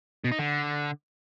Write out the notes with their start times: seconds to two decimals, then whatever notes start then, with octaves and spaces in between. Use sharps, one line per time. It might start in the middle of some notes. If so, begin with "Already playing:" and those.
0.24 B2
0.32 D#4
0.39 D3